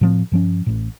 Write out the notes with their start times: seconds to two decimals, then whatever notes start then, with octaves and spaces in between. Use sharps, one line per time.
0.01 A2 F3 C4
0.32 G2 F3 C#4
0.66 A1 A2